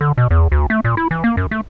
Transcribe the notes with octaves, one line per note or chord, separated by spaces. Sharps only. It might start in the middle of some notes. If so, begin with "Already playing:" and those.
D3
B2
E2
D2
A3
A#2
E4
E3
A#3
F#2
A3